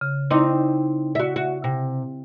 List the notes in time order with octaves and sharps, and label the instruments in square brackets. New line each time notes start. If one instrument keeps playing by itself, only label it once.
[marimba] C#3
[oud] C4 D#4 [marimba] E4 C6 D6
[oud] F#4 E5
F#4
C3